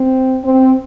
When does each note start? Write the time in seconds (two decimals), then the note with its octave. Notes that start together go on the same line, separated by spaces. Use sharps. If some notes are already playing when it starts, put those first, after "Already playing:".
Already playing: C4
0.44 C4